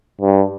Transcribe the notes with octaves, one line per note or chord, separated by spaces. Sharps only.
G2